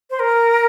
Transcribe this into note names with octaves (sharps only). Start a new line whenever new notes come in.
C5
A#4